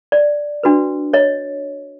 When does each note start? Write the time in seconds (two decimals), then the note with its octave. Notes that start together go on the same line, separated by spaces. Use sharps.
0.12 D5
0.63 D4 F#4 B4
1.13 C#5 D#5